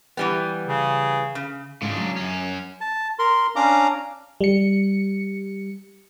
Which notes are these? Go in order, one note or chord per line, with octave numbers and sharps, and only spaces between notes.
E3 G3 B3
C#3
C#3
G#2 C#3 D4
F#3
F#2 C#4
A5
A#4 C6
C#4 D4 F5 A#5 D6
G3 C#7